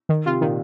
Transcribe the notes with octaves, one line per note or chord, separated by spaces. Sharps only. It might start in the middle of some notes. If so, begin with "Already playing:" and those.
D#3
C3 F4
A#2 D#3